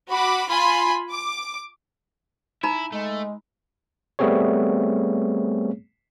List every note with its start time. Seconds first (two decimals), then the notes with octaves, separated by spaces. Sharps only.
0.10 F#4 B5 D6
0.50 F4 G#5 B5 C6
1.11 D6
2.63 D#4 E4 A#5 B5
2.92 G#3 A3
4.19 G3 A3 B3 C4 G#4 C#5